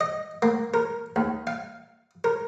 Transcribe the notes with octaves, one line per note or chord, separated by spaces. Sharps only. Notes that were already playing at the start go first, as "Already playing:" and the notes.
D#5
A#3
A#4
D#2
F5
A#4